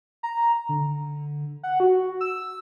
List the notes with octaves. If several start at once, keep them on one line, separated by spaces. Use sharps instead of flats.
A#5
D3
F#5
F#4
E6